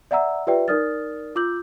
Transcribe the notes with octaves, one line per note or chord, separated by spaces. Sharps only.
D5 E5 F#5 A#5 E6
F4 G4 B4 D5 E5 G5
D#4 A#4 D5 D#6 F6 A6
F4 D6 E6 G6 F#7